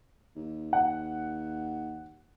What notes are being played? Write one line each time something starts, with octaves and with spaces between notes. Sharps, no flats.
D#2
F#5